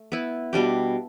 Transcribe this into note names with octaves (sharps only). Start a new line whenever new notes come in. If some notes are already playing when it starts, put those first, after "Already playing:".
Already playing: A3
B3 E4 B4
B2 G3 D4 G4